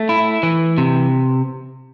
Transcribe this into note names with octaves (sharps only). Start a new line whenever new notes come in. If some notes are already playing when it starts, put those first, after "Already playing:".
Already playing: A3
E4
E3
C3